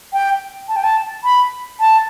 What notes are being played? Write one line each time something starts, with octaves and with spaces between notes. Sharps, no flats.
G5
A5
G5
A5
B5
A5